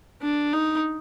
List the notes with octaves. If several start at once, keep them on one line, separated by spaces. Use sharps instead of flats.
D4
D#4